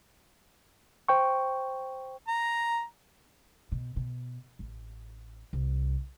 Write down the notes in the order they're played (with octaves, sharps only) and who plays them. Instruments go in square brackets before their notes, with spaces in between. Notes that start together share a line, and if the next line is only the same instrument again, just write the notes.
[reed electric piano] C5 G5 C#6
[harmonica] A#5
[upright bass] B2
B2
A1
C2